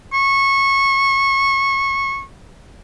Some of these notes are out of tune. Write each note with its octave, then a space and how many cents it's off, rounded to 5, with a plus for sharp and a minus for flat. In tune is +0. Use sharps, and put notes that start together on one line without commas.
C#6 -20